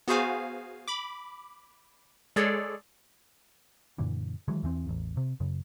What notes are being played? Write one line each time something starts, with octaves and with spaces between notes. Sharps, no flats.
B3 F#4 G#4 C5 F5 G#5
B5 D6
G#3 G#4 A4 C#5 D5
F#2 A#2 D3 E3
D#3 E3 F#3 G#3
E2 E3 C4
A1 E2
C3
F#2 C#3